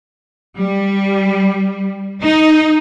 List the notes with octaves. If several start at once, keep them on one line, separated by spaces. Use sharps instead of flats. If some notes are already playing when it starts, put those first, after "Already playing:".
G3
D#4